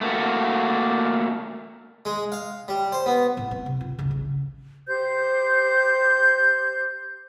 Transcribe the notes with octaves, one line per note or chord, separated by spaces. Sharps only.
A3 A#3 F#4
G#3
F5
G3
C5
B3
A2
B3
C3
F4
D2 C#3
A1
G4 C5 G6